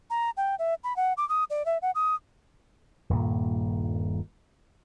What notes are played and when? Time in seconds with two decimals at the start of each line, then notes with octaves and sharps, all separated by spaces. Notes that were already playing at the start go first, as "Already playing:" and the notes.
0.10 A#5
0.37 G5
0.59 E5
0.84 B5
0.96 F#5
1.17 D6
1.29 D#6
1.50 D5
1.66 E5
1.82 F#5
1.95 D#6
3.10 D#1 G2 A#2 A#3